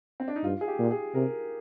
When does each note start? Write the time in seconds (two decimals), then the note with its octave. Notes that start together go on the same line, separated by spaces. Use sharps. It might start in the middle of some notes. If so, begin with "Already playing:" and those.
0.20 C4
0.28 D4
0.36 D#4
0.43 G2 F4
0.61 G#4
0.68 G4
0.79 A#2
0.91 G#4
1.14 C3 A#4